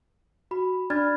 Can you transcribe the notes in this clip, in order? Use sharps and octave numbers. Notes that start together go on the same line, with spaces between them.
F#4 B5
D4 D5 B5 F6 G#6 A6